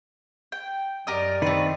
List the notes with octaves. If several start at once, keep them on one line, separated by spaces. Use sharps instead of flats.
G5
F#2 G4 A#4 D5 D#5
D#3 A3 C4 B4